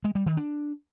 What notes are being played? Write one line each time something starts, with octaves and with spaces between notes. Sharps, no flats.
G#3
G3
D#3
D4